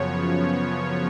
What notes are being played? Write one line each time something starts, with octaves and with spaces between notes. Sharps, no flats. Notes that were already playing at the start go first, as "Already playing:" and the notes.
Already playing: F#2 C#3 F3 B3 C#5